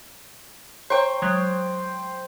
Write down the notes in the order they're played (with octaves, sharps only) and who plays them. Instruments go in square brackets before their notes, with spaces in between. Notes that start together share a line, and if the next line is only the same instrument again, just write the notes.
[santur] C5 G5 [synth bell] C#5 A#5 C#6
[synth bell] F#3 G#3